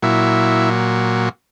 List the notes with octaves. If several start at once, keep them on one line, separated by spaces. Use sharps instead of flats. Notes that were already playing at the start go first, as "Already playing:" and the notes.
A#2 F#3 E4